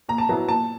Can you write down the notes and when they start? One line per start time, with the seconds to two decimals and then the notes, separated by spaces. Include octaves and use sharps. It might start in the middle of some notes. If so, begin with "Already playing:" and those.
0.09 A#2 A#5
0.18 A5
0.29 F#3 B3 E4 A#5
0.48 A#2 A5